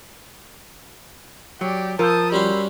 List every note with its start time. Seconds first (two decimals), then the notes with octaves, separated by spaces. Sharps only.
1.61 F#3 G4 D5
1.99 F3 F4 A#4 A5 D#6 E6 G6
2.32 G3 C#4 F#4 B5 C6